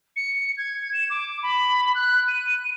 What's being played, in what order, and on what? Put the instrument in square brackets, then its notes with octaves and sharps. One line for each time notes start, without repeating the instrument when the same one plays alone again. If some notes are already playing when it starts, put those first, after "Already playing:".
[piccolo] C#7
G#6
E7
D6
B5
F#6
D#7